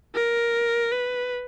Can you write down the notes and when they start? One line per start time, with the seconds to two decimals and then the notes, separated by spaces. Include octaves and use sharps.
0.15 A#4
0.92 B4